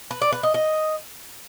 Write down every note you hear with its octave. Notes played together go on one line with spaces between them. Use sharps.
B4
D5
B4
D#5
D#5